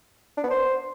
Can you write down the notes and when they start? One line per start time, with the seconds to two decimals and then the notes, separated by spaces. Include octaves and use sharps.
0.37 D4
0.44 B3
0.50 C5